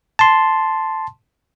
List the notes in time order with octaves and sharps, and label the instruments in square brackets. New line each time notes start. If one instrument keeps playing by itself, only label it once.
[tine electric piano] A5 C6